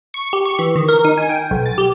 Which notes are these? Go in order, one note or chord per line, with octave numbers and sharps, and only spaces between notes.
C#6
G4
C#6
E3
D#3
A#4
D#4
G#5
G5
B1
A6
G4